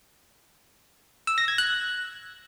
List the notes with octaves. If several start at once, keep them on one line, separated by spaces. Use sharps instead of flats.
E6
A#6
G#6
F#6